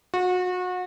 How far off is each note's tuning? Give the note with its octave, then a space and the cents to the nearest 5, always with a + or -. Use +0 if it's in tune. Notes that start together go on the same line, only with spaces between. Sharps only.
F#4 -30